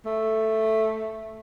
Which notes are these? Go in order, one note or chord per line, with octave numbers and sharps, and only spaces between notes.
A3